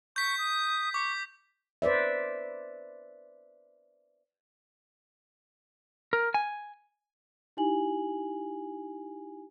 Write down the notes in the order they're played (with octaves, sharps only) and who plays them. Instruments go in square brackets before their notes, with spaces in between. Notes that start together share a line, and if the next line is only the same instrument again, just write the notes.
[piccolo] C#6 [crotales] G6 B6
[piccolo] D#6
[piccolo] C#6 [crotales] D6
[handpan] B4 C5 D5 E5
[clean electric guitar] A#4
G#5
[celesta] D#4 E4 G4 G#5 F#7